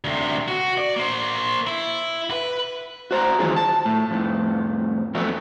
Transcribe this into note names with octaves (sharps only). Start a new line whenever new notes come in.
D2 C3
F#4
D5
A#3 C5
E4
B4
F#4 C5 A#5
D#3 E3 F#3 F4 G#4
A5
A2
F2 A2
F2 F#3 A3 B3